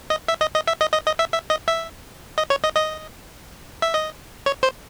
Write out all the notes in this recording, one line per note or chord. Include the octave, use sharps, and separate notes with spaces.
D#5
E5
D#5
D#5
E5
D#5
D#5
D#5
E5
E5
D#5
E5
D#5
C#5
D#5
D#5
E5
D#5
C#5
C5